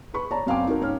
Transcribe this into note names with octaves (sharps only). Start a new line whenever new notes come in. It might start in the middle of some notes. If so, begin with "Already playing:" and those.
G#4 B4 B5 C#6
C#5 D5 A5 A#5
F#2 C4 F5 G5 G#5 D6
D#4 F#4 A#4
G#2 C#4 F6